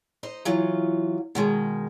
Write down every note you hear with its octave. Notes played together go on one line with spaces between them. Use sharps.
D#4 C5 D#5
E3 F#3 F4
B2 D#3 G#3